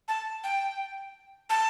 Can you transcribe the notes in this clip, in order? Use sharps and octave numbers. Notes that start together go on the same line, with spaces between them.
A5
G5
A5